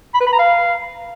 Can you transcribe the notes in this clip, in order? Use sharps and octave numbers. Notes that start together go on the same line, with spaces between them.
B5
B4
B5
A#5
F5